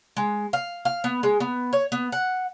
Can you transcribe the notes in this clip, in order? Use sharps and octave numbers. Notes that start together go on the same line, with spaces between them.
G#3
F5
F5
B3
G#3
B3
C#5
B3
F#5